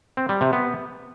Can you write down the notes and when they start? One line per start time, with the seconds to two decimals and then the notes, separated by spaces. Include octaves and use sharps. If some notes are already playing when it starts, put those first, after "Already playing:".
0.17 C4
0.29 G3
0.41 C3
0.53 B3